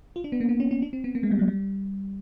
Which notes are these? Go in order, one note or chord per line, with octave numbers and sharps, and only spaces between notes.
F4
D4
B3
A#3
B3
C#4
C#4
D4
C4
B3
A#3
G#3
G3
F#3
G3